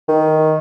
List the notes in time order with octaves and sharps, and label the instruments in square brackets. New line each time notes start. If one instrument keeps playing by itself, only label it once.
[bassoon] D#3